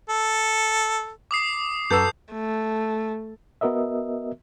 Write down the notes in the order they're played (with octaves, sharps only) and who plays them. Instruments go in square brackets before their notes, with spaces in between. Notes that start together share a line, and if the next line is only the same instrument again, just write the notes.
[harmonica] A4
[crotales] D6 D#6 C7
[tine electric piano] F#2 A#5 E6 [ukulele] F#4 A4 B4 [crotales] G6 C7
[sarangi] A3
[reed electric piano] B3 F#4 A#4 D#5 E5